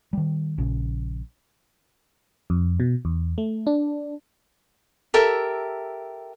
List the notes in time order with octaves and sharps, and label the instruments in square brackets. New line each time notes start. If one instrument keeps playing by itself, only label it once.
[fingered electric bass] D#3 G3
A#1 C#3
[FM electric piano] F2
B2
E2
A3
D4
[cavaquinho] G4 A4 A#4 E5